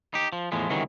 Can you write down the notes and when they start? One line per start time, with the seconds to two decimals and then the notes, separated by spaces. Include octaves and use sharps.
0.14 D#4 G4
0.33 F3
0.52 E2 A2 F3 G#3
0.69 C#2 C3 D#3 E3 F#3